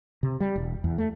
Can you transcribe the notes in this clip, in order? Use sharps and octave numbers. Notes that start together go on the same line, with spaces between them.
C3
G3
E1
E2
A3